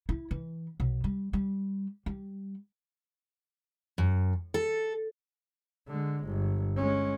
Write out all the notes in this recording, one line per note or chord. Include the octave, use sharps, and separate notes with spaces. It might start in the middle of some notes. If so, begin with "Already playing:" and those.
E4
E3
B1
G3
G3
G3
F#2
A4
D3 G#3
G1
G#3 C#4